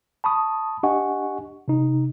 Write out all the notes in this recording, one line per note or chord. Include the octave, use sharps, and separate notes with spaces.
A5 B5 C#6 D#6
D4 G4 D#5 F#5 G#5 C#6
C3 D#4